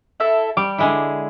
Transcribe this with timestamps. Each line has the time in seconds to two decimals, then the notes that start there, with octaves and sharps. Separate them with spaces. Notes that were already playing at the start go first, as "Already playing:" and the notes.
0.20 E4 A4 E5
0.57 G3 D6
0.78 D3 G#3 E4